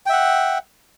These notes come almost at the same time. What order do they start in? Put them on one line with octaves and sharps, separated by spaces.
G5 E5 F#5